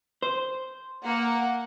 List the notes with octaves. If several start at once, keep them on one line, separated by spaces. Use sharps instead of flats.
C5
A#3 F#5